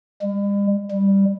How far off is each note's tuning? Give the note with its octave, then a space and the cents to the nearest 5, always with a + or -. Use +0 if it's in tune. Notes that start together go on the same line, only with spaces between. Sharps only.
G3 +45
G3 +5